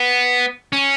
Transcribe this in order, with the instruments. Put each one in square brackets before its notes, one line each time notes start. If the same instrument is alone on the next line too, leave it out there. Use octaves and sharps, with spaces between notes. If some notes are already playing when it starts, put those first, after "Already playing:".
Already playing: [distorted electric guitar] B3
C#4